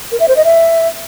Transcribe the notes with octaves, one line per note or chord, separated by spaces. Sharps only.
A#4
E5
C5
D#5
E5